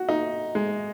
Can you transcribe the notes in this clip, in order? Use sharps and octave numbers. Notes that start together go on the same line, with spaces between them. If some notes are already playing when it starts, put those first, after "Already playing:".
Already playing: F#4
D#4
G#3